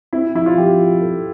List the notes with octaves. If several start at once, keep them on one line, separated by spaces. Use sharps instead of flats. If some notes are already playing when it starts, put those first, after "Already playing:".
C4 E4
F3 E4
F4
F3 G4
F4
A4